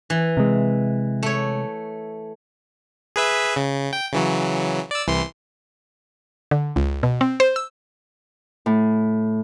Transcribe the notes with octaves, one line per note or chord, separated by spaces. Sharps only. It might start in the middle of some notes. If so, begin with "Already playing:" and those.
E3
C3 G#3
A3 C#5
G#4 B4 E5
C#3
G5
C#3 E3 F#3
D5 E6
C2 E3 C6
D3
C#2
B2
C4
C5
E6
A2